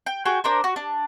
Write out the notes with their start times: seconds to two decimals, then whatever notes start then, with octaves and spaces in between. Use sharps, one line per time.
0.06 G5
0.25 F#4 G#4 G5
0.44 D4 A#4 C5
0.64 F#4
0.76 D4